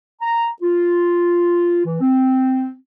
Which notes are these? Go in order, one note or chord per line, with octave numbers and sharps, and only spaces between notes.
A#5
F4
E3
C4